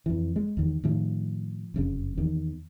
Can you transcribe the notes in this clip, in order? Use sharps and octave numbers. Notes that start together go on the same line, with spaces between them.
F2 E3
G#3
E2 D#3
A2 D#3 F3
F1 F#2 C#3
E2 D#3